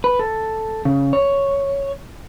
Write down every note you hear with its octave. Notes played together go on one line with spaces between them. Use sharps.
B4
A4
C#3
C#5